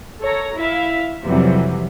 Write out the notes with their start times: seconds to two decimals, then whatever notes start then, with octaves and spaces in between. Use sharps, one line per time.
0.21 A4 C#5 A#5
0.55 E4 E5 F5
1.24 F2 C3 E3 F#3 G3